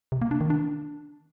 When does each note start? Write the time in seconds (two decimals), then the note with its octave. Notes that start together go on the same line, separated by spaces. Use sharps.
0.12 C3
0.22 A#3
0.31 D4
0.41 D#3
0.50 D4